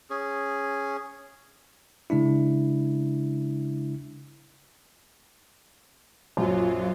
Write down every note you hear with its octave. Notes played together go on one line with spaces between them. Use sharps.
C#4 G#4
C#3 G#3 D4 E4
A#1 F#2 F#3 F4